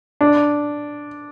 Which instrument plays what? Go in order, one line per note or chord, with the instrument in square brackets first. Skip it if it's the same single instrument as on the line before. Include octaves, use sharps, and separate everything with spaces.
[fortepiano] D4